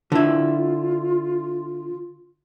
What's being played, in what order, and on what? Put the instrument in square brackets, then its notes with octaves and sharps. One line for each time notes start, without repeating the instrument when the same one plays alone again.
[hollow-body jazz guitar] D3 E4 [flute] F4